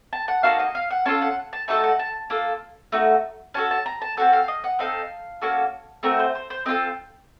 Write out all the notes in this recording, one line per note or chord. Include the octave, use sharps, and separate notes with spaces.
A5
F#5
A#3 D#4 F#4 A4 F5
D#5
F5
F#5
C#4 F4 A4 A5
F#5
A5
A3 D#4 F#4 A4 A5
F#5
A5
A#3 F4 A4
A3 D#4 F#4
C#4 F#4 A4 A5
A5
A#5
A5
C4 F#4 A4 F#5
F5
D#5
F#5
C4 D#4 A4 F5
A#3 C#4 F#4 A4
A3 C4 F#4 A#4
C5
C5
C5
C4 F4 A4 D#5